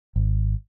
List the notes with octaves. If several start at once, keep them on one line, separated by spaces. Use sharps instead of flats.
G#1